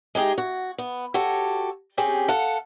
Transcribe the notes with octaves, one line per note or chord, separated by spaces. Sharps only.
G#3 D#4 G4 G#4
F#4
B3
F#4 G4 A4 C#5
C4 C#4 G4 G#4
A4 F5 F#5